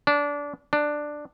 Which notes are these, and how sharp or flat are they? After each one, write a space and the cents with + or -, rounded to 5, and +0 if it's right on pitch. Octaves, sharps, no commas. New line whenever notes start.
D4 -20
D4 +10